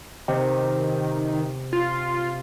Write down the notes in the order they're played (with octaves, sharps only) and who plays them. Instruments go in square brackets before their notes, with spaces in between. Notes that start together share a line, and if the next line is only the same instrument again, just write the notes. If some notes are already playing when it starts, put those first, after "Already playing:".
[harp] C3 [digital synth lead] D#3
[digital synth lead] F4